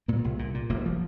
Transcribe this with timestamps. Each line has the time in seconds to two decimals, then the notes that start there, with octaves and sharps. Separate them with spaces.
0.08 A#2 A#3
0.24 C2
0.39 A#2
0.54 A#2
0.70 F1 A#3
0.86 F3